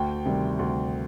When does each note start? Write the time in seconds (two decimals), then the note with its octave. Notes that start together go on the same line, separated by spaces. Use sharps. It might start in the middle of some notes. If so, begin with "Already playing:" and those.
Already playing: D2 G5
0.26 C3 D#3 G3
0.59 D2